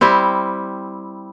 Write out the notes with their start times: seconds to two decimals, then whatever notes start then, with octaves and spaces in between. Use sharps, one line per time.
0.01 G3 C4 E4